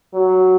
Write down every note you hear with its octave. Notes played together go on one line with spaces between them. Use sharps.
F#3